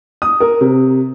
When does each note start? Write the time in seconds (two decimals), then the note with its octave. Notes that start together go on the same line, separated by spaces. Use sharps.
0.22 D#6
0.40 A#4
0.61 C3